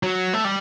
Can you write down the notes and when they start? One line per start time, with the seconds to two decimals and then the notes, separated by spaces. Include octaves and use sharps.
0.03 F#3
0.33 A3
0.44 G3